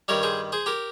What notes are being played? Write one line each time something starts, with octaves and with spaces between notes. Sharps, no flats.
G2 D#3 G3 A#4 C#5
G#4 C5
G#4 C5
G4 A#4